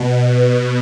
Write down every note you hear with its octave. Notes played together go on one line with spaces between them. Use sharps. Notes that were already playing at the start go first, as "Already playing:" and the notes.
Already playing: B2